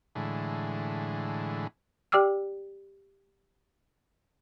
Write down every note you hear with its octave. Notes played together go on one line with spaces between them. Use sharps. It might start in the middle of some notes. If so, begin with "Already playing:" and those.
A2 D3 E3 G#3
G4 D5 G5 D6 E6 F6